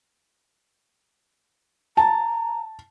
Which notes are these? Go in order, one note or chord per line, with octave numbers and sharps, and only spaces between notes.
A5 A#5